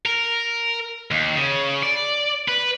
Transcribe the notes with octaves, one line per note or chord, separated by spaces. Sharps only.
A#4
D#2
C#3
D5
B4